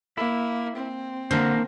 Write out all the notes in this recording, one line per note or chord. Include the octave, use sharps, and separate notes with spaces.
A#3 E4
C4
D3 A#3 A#4 C5